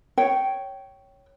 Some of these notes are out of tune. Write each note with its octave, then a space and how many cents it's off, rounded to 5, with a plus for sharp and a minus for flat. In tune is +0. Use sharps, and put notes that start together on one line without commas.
C#5 +0 G5 -15